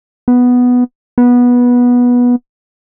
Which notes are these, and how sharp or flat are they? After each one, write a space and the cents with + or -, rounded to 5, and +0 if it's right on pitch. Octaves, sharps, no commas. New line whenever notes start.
B3 +0
B3 -15